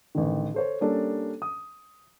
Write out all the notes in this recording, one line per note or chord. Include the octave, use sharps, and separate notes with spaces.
A1 D3 D#3
A4 C5 C#5
G3 A#3 C#4 D4 A4
D#6